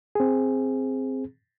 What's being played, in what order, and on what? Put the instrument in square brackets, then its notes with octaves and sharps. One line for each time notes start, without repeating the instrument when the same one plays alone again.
[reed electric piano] C4 G#4